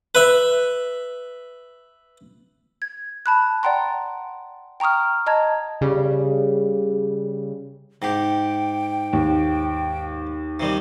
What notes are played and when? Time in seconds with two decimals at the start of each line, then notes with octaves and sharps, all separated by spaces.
0.15 B4 E5
2.82 G#6
3.26 A5 B5 F#6
3.63 D5 F#5 G5 A#5 C6
4.80 G5 A#5 C#6 D#6 F6
5.27 D#5 A5 A#5 G#6
5.81 C#3 G3
8.02 G#2 G4 G5
9.13 D#2
10.60 C3 D#3 G3